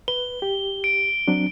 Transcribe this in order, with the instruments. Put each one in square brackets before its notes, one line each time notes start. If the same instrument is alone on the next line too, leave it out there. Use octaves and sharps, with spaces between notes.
[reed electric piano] B4 [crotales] G7
[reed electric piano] G4
[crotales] D7
[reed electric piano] F#3 C4 D4